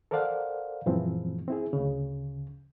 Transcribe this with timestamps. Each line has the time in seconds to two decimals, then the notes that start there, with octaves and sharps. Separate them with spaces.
0.11 A4 A#4 C5 D5 F5 F#5
0.86 F#2 A#2 E3 F3 G#3 C4
1.48 C4 E4 G#4
1.73 D2 C#3